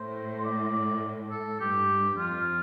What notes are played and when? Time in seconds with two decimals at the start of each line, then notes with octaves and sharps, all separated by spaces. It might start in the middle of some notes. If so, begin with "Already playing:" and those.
Already playing: A2 C5
0.39 C5
0.45 D5
0.73 D5
1.30 A4
1.59 G2 G4
2.17 F2 F4